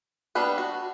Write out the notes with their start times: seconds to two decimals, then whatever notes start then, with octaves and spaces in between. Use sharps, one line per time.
0.35 G3 B3 D4 B4
0.58 F#4